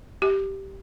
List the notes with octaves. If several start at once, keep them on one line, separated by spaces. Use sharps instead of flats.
G4